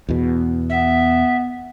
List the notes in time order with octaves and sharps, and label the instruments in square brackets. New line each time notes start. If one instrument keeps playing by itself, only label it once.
[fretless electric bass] E2 B2
[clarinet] B3 [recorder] E5